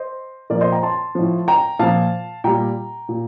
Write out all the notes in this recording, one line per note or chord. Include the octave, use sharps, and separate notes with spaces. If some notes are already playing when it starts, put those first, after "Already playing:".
Already playing: C5 D#5
A#2 F3 A#4 D5
C5 D#5
G5 A#5
A5 C6
A2 F3
G5 A#5
A#2 F3 F5 A5
A#2 G3 G5 A#5
A#2